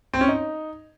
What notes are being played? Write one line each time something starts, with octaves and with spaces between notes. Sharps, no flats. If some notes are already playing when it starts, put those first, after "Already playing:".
C4
C#4
D#4